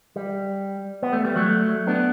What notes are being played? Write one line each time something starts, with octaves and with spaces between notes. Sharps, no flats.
G3
B3
A3
G3
F#3 A3
B3 D4